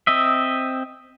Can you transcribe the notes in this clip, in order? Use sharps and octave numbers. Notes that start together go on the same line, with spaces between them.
C4 D#5 E5